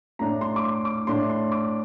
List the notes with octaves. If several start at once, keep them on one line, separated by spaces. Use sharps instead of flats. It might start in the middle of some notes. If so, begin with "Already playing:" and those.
A2 A3 D4 A#5
C6
D6
C6
D6
A2 A3 D4 C6
C6
D6